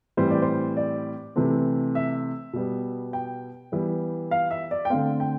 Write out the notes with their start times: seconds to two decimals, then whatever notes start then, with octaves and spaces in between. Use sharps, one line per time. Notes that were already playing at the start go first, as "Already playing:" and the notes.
0.17 A2 E3 G3 C4 C5
0.30 D5
0.42 C5
0.77 D5
1.36 C3 E3 A3 C4
1.95 E5
2.53 B2 G3 B3
3.13 G5
3.72 E3 G3 B3
4.31 F5
4.51 E5
4.71 D5
4.85 G5
4.90 D3 A3 C4 F5
5.20 G5